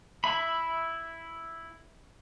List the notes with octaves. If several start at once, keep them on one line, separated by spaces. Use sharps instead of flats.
E4 E5 B5